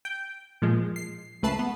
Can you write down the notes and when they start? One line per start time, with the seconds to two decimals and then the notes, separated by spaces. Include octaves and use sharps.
0.05 G5
0.62 A#2 F3 G#3
0.96 C7
1.43 C#2 A3 B4 A5 C7
1.59 B3